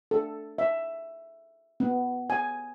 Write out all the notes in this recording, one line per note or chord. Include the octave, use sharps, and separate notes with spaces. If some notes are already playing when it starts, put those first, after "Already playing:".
A4
E5
B3
G#5